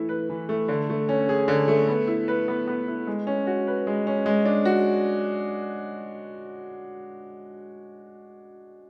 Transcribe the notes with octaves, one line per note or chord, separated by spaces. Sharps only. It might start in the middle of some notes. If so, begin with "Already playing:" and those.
Already playing: E3 A3 E4
B4
E3
A3
D3
A3
C#4
G#4
D3
A3
B3
E4
B4
B3
B3
E4
G#3
C#4
F#4
B4
G#3
C#4
G#3
D4
F#4